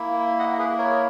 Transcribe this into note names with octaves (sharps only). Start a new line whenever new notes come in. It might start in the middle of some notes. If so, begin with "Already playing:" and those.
Already playing: A#3 E4
D#5 F#5
G#4 B4
A#4 C#5